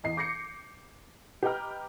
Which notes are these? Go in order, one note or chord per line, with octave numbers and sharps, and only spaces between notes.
E2 D#5 C7
D6 G6 A#6 C7 C#7
G4 B4 D#5 G5 A#5 F6